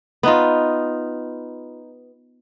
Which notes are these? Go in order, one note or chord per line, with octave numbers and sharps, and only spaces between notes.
B3 D#4 F4